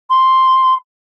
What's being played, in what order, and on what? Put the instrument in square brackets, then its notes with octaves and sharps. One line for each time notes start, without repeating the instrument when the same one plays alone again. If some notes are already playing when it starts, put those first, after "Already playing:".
[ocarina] C6